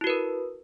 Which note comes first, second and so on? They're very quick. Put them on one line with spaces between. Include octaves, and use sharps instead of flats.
E4 F#4 B4 A#4